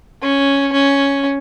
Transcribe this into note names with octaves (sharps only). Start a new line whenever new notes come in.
C#4
C#4